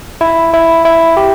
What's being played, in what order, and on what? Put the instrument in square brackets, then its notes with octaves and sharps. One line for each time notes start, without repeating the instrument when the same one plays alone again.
[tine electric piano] E4
E4
E4
G4